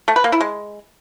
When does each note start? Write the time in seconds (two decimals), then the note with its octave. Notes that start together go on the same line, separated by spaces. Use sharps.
0.08 A3
0.16 B4
0.24 A#3
0.32 E4
0.41 G#3